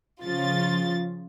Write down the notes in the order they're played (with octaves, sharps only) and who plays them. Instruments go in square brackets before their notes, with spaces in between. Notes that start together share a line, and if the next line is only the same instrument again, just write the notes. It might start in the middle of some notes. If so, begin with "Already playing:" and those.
[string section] C#3 F3 F4 A6